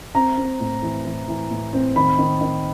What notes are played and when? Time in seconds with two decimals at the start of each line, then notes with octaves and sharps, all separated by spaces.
0.15 C4 A#5
0.38 C4
0.60 A2
0.82 E3
1.05 E3
1.28 E3
1.51 A2
1.73 C4
1.96 D#3 B5
2.18 D#3
2.41 D#3